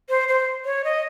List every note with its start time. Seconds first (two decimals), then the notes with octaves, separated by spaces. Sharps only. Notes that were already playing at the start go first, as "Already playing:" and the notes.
0.09 C5
0.28 C5
0.65 C#5
0.84 D#5